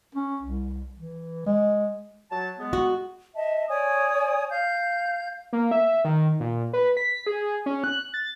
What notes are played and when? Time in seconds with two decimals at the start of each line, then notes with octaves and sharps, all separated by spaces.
0.15 C#4
0.42 C2
0.97 E3
1.46 G#3
2.31 F#3 A5
2.59 G#3 B3
2.73 F#4
3.34 D#5 E5 A5
3.69 C#5 D5 G#5 D#6
4.50 F5 G6
5.53 A#3
5.71 E5
6.05 D#3
6.40 A#2
6.73 B4
6.97 B6
7.26 G#4
7.66 C#4
7.84 F#6
8.14 A6